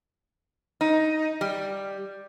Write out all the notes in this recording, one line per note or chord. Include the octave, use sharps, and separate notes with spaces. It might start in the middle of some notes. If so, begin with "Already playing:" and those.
D#4
G3